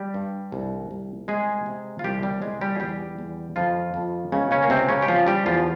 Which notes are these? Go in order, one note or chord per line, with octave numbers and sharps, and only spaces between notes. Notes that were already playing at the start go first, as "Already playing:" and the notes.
Already playing: G3 G4
G2
C2
C2
C3 G#3 G#4
C3
F4
C2 G3 G4
G3 G4
C2 G#3 G#4
G3 G4
G#4
E2 G3 G4
E2
F2 F3 F4
F2
C#2 C#3 C#4
C#3 C#4
A#3
C#2 C3 C4
C#3 C#4
G4
C#3 F3 F4
G3 G4
E2 F3 F4